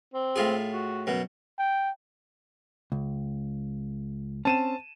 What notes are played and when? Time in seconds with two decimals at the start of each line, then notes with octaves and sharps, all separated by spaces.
0.14 C4
0.36 A2 F4 G#4
0.72 F#4
1.07 F#2 B2
1.59 G5
2.92 C#2
4.45 C4 C#4 A5 D#7 E7